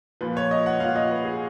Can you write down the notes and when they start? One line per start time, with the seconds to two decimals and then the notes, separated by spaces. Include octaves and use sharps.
0.21 A#2 F3 B4
0.37 C#5
0.51 D#5
0.66 F#5
0.80 A#2 F3 F5
0.96 D#5
1.11 B4
1.25 G#4